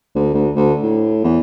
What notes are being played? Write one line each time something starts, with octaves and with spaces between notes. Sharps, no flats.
D2
D2
D2
A2
E2